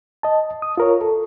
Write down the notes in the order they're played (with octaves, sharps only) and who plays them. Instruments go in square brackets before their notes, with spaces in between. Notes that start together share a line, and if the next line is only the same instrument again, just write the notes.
[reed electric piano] D#5 A5
D#6
F4 A#4 C#5
A4